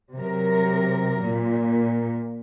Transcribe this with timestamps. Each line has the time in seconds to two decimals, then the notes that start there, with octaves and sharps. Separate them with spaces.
0.15 C3 F#3 A#4
1.25 A#2